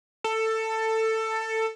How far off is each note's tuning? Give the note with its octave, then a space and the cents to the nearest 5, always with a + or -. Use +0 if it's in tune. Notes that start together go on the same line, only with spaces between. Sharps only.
A4 +15